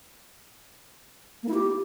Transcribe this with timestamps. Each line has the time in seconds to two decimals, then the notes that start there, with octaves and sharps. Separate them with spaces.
1.43 A#3
1.49 E4
1.54 G4